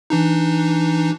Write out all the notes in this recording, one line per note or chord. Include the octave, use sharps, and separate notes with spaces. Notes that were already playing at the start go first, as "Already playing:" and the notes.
E3 D4 D#4